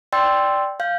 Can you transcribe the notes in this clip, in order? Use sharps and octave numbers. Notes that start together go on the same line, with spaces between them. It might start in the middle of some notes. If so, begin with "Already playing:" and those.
D5 G5 C6 E6 A6
F5 G6